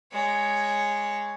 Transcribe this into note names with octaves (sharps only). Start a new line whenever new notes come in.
G#3 C#5